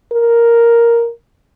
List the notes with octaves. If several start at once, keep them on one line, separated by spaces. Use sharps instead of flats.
A#4